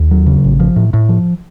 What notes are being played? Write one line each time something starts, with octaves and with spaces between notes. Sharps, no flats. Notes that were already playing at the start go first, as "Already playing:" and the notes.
Already playing: D#2
F#3
C#3
A1
F3
A2
A2
F3